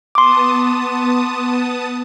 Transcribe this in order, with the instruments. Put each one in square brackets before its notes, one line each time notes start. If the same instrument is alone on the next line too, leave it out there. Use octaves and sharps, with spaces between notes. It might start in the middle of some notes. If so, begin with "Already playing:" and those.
[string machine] B3 A5 D#6 [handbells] C6 D6